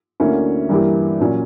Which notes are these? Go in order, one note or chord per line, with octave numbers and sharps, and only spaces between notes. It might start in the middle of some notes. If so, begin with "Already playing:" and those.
D2 D3 A#3 C#4 E4
G2 E3 A#3 E4 G4
A#2 F#3 C#4